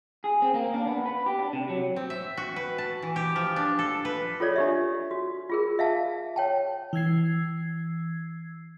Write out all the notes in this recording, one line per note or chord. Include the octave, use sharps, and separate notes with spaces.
G#4
C4
A#3
D4
B3
B4
G4
D4
C3
F#3
C4
E5
F#4
B4
A5
E3
G4
F3
D4
A4
B4
F4 A4 C#5 D5
D4 G4 E5
F#4
F4 G#4 A#4
E5 F5 A5
C#5 G5 A5
E3 E6 G#6 C7